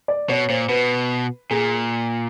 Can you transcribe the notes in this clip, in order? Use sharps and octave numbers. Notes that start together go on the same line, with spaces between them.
D5
B2 C#5
A#2 C5
B2 B4
A#2 G#4